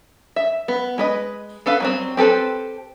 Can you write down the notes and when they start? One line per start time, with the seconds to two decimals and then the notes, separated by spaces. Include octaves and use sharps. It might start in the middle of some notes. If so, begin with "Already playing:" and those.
0.36 E5
0.68 B3
0.98 G#3 B4 D#5
1.66 B3 A4 B4 F5
1.80 F#3 G3 C4
2.17 C4 G4 A4 B4 C5